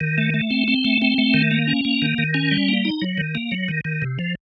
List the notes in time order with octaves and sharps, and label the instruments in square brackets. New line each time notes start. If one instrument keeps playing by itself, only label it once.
[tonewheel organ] D#3
A3
A3
C4
C4
A3
C4
A3
D#3
A#3
C#4
A#3
D#3
D#3
C#4
G3
A#3
D#4
F#3
D#3
A#3
F#3
D#3
D#3
C3
F3